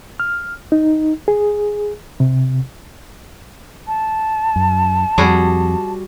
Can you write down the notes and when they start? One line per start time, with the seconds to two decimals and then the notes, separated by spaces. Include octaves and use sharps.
0.20 F6
0.72 D#4
1.28 G#4
2.20 C3
3.87 A5
4.56 F#2
5.18 F2 G3 F#4 G#4